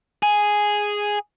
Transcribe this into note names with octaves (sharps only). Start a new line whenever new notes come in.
G#4